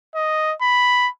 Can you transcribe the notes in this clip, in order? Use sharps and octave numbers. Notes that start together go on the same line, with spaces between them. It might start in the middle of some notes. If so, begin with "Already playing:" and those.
D#5
B5